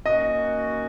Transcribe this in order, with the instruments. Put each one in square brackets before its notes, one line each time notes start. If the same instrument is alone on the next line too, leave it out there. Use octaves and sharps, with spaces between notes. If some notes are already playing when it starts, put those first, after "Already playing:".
[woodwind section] D#3 F#3 A#3 C#4 F#4 [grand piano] D#5